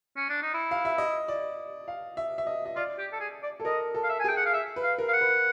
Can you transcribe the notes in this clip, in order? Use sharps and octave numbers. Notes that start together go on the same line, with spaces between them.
C#4
D4
D#4
E4
F5
E5
D#5
D5
F5
E5
E5
D#5
D#5
F4 D5
G4
A4
G#4
D5
A4
A#4 D#5
A4
F5
E5
G#5
G#4 G5
F#5
F5
E5
B4
F5
A#4
F5
F#5
B4